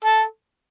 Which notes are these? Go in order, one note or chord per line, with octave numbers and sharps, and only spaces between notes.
A4